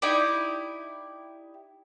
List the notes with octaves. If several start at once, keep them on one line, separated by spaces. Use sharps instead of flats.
D#4 E4 G4 D5